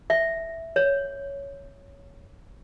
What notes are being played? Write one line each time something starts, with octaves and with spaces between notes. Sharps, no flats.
E5
C#5